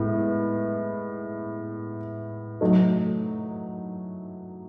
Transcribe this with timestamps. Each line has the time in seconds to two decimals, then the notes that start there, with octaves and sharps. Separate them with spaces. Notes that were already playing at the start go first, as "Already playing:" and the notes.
Already playing: A2 G#3 B3
2.61 F#3 A3 D#4